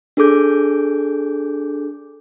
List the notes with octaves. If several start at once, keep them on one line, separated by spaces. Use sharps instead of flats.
D4 G#4 A4 D6 G6